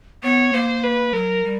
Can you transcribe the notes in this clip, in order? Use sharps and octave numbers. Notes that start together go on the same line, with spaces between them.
B3 C#5
A#3 C5
B4
F#3 A#4
G3